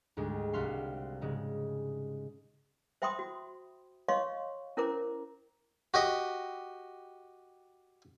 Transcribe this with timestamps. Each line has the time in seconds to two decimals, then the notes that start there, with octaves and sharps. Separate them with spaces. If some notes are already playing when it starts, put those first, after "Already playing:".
0.17 D2 G#2 G3 G#3
0.53 C2 G3 F#4 E5 F5 C6
1.21 G#2 C#3 G#3
3.02 C5 E5 G5 B5 C6 D#6
3.19 F#4
4.08 C#5 D#5 F5 C6 C#6
4.77 C#4 E4 A#4 C5 A#5 D6
5.94 F#4 G4 D#5